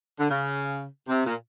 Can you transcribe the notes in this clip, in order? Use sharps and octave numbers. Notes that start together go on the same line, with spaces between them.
D3
C#3
C3
A#2